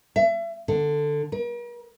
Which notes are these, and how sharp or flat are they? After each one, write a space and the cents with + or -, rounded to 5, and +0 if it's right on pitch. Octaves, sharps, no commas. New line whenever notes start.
E5 +35
D3 +10
A#4 +45